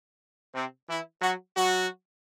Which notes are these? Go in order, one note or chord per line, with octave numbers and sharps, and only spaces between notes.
C3 C4
E3 E4
F#3 F#4
F#3 F#4